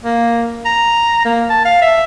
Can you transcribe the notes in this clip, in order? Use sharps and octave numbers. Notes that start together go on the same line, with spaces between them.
A#3
A#5
A#3
A5
F5
E5